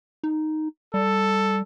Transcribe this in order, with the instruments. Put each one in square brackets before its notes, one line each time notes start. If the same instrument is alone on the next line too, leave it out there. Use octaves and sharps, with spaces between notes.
[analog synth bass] D#4
[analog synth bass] G3 [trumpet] A4